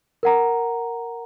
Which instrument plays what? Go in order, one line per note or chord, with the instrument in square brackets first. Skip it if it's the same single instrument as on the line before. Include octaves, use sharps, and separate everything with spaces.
[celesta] A#4 F#5 A#5